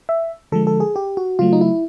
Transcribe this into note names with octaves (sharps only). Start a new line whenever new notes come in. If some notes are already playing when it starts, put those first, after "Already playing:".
E5
D3 F3 G#3 A4
A4
G#4
G4
F#4
C#3 F#3 A3 F4
D#4
E4